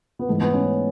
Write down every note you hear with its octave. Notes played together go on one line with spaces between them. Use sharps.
B3
G#2 E3 A3
B3
C#4